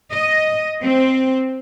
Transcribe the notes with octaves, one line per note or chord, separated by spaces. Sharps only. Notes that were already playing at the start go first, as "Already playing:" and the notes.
D#5
C4